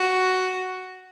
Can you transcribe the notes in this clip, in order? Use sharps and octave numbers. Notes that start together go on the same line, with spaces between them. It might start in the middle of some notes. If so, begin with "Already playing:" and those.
Already playing: F#4